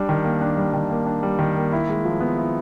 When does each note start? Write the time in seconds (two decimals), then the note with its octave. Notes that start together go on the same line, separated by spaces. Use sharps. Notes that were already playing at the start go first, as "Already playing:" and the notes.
Already playing: G3 D4
0.09 D#3
0.24 A#3
0.41 D4
0.58 G3
0.74 D#3
0.90 A#3
1.06 D4
1.23 G3
1.39 D#3
1.56 A#3
1.72 E4
1.89 G#3
2.05 F3
2.20 B3
2.38 E4